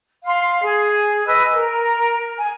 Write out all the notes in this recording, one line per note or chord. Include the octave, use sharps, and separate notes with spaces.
F5 C6
G#4
B4 D#5 G#5 E6
A#4
G#5